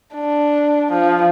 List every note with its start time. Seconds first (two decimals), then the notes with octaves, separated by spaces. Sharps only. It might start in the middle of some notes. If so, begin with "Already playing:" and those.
0.15 D4
0.92 F3